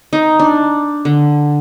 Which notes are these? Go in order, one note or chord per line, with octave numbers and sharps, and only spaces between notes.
D#4
D4
D3